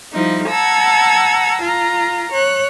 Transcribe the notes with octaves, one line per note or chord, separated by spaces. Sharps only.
F3 G3 D#4 E4
F#5 A5 A#5 E6 G#6
F4 A#5
C#5 F#6